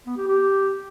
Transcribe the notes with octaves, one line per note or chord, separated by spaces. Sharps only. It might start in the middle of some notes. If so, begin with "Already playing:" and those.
B3
G4
G4